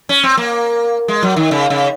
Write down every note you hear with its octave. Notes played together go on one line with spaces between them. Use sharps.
C#4
C4
A#3
G#3
F#3
D#3
C#3
C#3